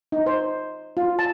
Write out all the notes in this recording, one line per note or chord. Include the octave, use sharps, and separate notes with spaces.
D#4
C5
F4
A5